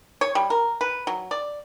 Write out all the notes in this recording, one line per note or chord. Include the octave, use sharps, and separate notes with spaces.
C#5
G3
A#4
B4
F#3
D5